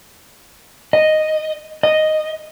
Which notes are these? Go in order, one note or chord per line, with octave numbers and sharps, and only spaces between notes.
D#5
D#5